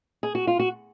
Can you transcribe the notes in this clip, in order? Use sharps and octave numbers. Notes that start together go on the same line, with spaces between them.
G#4
F#4
F4
F#4